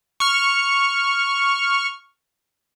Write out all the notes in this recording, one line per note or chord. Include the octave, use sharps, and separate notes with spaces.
C#6 F6